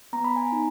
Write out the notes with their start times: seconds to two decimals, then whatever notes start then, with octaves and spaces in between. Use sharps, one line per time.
0.13 B3 A#5
0.24 B5
0.36 G#5 A#5
0.52 D#4